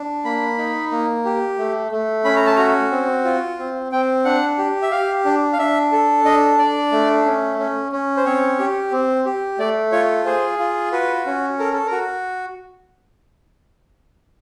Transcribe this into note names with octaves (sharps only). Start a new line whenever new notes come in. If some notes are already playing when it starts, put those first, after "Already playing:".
Already playing: D4
A#3 B5
D#4
A#3
G4
A3
A3
C#4 B5
A#5
A5
F#4 A#5
C4
F4
C4
C4 G5
D4 F#5
G4
E5
G4 F5
D4
F5
D4 E5
A4
D4 D#5
D4 D5
A3
C#4
C#4
C#4
C5
C4 C#5
G4
C4
G4
A3 D5
F4 C#5
G#4 C5
F4
F#4 B4
C#4
A4 A#4
A4
A#4
F#4